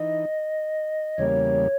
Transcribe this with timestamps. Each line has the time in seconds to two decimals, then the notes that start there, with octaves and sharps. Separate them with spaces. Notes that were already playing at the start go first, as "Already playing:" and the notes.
Already playing: E3 D#4 D#5
1.18 E2 C#3 G3 A#3 C#5